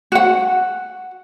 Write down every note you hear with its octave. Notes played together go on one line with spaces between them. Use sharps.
F#4 F#5